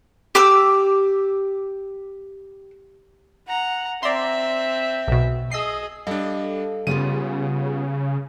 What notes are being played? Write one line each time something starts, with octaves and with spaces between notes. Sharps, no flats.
G4 D6 E6
F#5 A#5
C4 D5 E5 A#5 C6
B1 B2
G#4 D#5 E6 C7
G3 D4 A4 D#5 F5
C#3 G3 B3 F4 D#7